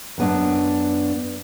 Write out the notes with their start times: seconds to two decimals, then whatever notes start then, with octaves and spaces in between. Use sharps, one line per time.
0.18 F#2 B3 D4